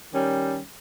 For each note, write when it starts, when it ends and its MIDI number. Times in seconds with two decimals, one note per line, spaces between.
0.12 0.61 51
0.12 0.61 55
0.12 0.61 61